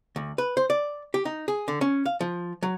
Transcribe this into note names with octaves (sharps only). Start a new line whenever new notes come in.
D2
B4
C5
D5
G4
D#4
G#4
D3
C#4
F5
F3
F#3